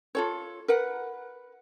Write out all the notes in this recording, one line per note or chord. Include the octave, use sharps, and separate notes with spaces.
F4 A4 C#5
A#4 B4 F#5